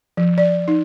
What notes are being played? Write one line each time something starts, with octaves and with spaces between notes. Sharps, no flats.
F3
D5
D#4